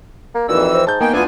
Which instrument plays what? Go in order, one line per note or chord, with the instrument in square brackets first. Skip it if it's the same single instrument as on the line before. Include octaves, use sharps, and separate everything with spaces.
[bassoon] A#3
[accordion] F2 E3 E6 [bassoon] A#2 [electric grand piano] D#4 F#4 D5
[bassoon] C4
[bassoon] G#2 [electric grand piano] A5 G6
[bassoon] D#3 [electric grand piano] A#3 B3 G#5 [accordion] G5
[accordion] D2 B3 G#5 [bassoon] E3 [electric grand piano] D4 F4